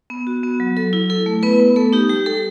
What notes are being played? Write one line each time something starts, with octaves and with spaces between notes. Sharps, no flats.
B3
F#4
B3
F#3
F#3 A4
E4
E4 A4
A3
B3 B4
B3
A3 A4
D#4 G4
G3 G4
G3 A4